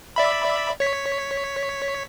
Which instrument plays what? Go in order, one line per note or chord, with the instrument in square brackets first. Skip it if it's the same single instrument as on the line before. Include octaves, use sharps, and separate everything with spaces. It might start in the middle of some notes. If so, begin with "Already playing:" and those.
[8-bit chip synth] D5 E5 B5
C#5 B6